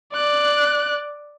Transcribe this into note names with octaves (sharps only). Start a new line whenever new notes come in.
D5 F#6